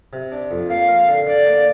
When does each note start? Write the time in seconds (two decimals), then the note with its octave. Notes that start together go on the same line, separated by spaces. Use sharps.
0.13 C3
0.32 D4
0.51 F2
0.70 A#3 F5
0.88 A#4
1.08 D3
1.27 D3 D5
1.46 A#3